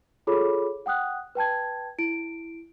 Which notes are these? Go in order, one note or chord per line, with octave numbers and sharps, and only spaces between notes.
F4 G#4 A4 C#5 B5 D6
F#5 G5 D#6 F#6
B4 G5 A5 G#6
E4 D7